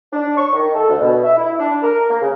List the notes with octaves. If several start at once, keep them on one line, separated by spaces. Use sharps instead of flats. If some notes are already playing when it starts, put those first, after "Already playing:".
D4
C#6
D#3
A4
D2
B2
E5
E4
D4
A#4
A#3
C#3